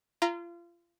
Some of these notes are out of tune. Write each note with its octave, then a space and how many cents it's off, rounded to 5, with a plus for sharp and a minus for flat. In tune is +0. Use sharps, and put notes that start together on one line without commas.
F4 -30 A#5 +0